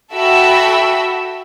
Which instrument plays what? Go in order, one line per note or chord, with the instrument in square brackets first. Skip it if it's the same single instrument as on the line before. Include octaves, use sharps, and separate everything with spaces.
[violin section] F#4 A4 E5 G5 B5 E6